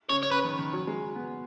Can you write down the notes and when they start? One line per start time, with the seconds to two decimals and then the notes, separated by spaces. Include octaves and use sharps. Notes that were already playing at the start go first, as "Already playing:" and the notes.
0.09 C#3 C#5
0.23 C#5
0.31 C#3 B4
0.45 D#3
0.59 D#3
0.73 F#3
0.87 G#3
1.15 B3